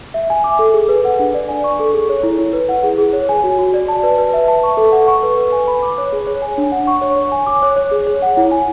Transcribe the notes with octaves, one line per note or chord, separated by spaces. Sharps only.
E5
G#5
D6
A4
G#4
B4
F#5
D4
D5
G#5
C#6
A4
G#4
C#5
E4
E4
B4
F#5
G#4
G#4
C#5
G#5
F#4
F#4
D5
A5
B4
B4
E5
A5
C#6
A4
F#5
C#6
B4
B4
G#5
B5
D6
C#5
G#4
C#5
G#5
D4
F#5
C#6
C#5
C#5
G#5
D6
C#5
C#5
G#4
C#5
F#5
E4
G#5